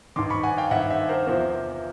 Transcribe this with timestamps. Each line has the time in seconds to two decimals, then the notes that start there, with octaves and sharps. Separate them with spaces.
0.16 G2 D#3 C6 D6
0.30 B5 C#6
0.43 F#5 G#5
0.57 F5 G5
0.71 G2 E5 F#5
0.76 D#3
0.90 E5 F#5
1.09 A#4 C5
1.26 E2 C3 F3 A#4 C5